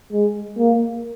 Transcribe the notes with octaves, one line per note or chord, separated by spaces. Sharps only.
G#3
A#3